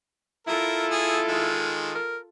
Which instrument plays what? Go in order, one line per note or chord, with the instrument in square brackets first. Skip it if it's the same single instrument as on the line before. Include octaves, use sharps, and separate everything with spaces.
[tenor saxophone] E4 [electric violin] F4 A4 [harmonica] A#4
[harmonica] G#4
D#3 G#3
[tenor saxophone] A#4